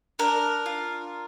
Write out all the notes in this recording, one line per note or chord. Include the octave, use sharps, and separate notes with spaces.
D4 A#4
F4